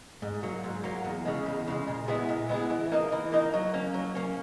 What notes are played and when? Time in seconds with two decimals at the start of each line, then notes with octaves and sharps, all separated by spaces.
0.22 G#2
0.43 F#3 A#3
0.64 G#2
0.84 F#3 A#3
1.05 E2
1.25 C#3 G#3
1.46 E2
1.67 C#3 G#3
1.88 A#2
2.08 G#3 B3 E4 G#4
2.29 A#2
2.49 G#3 B3 E4 G#4
2.70 E3
2.92 A#3 D#4 A#4 D#5
3.12 E3
3.32 A#3 D#4 A#4 D#5
3.54 F#3
3.74 A#3 C#4
3.94 F#3
4.15 A#3 C#4